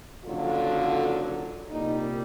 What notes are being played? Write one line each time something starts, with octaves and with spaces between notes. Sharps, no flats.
F#1 F2 D3 F#3 F4
C2 A#2 G3 D#4